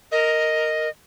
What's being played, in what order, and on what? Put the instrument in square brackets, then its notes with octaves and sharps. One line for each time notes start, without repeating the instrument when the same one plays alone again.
[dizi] A#4 [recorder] D#5